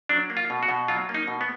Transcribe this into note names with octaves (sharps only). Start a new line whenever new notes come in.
F#3 D4
A#3
F4
B2
F#4
B2
F#3 F4
A#3
D#4
B2
B3